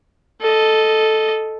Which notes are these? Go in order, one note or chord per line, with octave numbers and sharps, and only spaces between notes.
A4 D#5